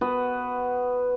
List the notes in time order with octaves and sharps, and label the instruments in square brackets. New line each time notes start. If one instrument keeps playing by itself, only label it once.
[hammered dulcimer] B3 F#4 B4